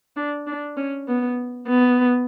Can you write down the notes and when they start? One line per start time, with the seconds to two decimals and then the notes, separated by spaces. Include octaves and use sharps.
0.16 D4
0.47 D4
0.77 C#4
1.08 B3
1.68 B3